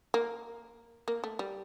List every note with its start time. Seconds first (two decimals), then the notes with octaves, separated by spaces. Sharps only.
0.14 A#3
1.08 A#3
1.24 A3
1.39 G3